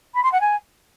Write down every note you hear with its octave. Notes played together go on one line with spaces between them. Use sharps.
B5
C6
F#5
G#5